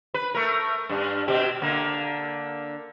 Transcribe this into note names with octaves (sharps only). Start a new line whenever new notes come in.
B4
A3 A#4
G2 D4
B2 C4 G4
D3 A#3